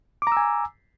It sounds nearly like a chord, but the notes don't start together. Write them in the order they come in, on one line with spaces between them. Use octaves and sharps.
D6 A#5 E6 G#5